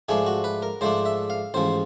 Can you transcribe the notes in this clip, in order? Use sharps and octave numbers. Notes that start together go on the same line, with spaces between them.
G#2 F3 A3 D4 G#4
F#4
B4
A#4
G#2 F3 A3 D4 C5
E5
F5
A1 G#2 F3 C5